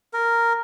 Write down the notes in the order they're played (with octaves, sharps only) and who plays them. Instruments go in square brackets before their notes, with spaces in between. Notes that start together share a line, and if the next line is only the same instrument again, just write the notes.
[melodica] A#4